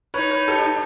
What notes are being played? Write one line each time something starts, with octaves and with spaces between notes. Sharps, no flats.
D#4 B4 C#5
B4 C#5
G4 A4